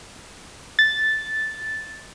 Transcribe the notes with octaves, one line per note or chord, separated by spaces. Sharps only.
A6